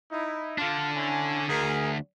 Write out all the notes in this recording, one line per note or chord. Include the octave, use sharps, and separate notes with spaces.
D#4 E4
D3 D4 F4
C#4 E4 G#5
D2 G#4 A#4